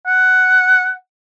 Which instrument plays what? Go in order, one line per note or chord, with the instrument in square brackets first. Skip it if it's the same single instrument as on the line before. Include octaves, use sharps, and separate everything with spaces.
[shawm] F#5